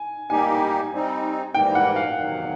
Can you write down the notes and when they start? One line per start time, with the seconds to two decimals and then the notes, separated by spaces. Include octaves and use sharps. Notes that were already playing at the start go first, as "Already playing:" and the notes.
Already playing: G#5
0.30 G3 A#3 D#4 G4 G#5
0.93 G3 C4 D#4
1.54 G#2 E3 G3 A#3 G5
1.75 F#5
1.96 F5
2.16 E2 C3 D#3 F#3